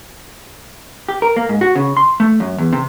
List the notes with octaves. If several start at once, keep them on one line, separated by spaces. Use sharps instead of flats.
G4
A#4
A#3
G#2
F#4
C#3
C6
A3
F#2
E2
C3